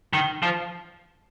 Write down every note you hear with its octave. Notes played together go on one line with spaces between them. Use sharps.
D#3
F3